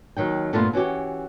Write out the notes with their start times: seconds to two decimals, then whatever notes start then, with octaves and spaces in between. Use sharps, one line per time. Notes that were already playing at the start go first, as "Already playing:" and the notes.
0.17 D#2 D#3 F#3 G5
0.53 G2 A#2 A3 B3 E4 F4
0.73 E3 C#4 F#4 G4